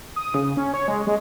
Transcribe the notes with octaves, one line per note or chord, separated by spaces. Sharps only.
D#6
C#3
C#4
C#5
G#3
G#3